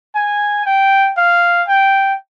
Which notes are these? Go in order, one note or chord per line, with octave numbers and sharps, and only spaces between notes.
G#5
G5
F5
G5